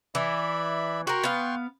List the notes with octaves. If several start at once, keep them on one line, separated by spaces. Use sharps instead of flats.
E3 D5 E5 B5
F#4 A#4 G5 C6 C#6
B3 F5